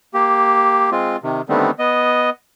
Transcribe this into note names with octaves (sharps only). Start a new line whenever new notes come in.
A#3 G4
G#3 C4 F4
C3 D#3
D3 D#3 G3 A3 B3 C4
B3 D#5